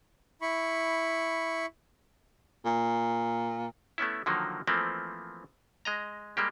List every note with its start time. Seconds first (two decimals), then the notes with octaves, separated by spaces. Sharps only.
0.42 E4 B5 C#6
2.66 A#2
3.98 A3 B3 C#4 E4
4.26 D3 D#3 F3 F#3 A#3
4.67 E3 F3 A3 A#3 C4
5.85 G#3 D#5 A#5
6.37 G3 G#3 A#3 G4